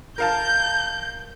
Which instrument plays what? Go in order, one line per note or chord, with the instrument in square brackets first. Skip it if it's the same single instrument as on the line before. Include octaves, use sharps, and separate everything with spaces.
[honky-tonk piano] A#4 F5 A5 [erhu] G6